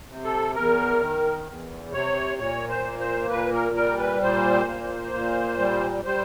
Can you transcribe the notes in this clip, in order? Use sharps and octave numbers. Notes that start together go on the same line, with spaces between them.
C3
A4
E2 A#4
D#3
E2
C3 C#5
A#2 C#5
C5
A#3
C5
A#2 B4
A#4
G3 A#4
B4
A#2 C5
A#3
A#2
G3
G3 C5